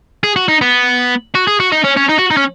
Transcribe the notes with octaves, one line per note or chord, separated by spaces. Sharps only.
G#4
F#4
D#4
B3
F#4
G#4
F#4
D#4
C#4
C#4
D#4
F#4
D#4
C#4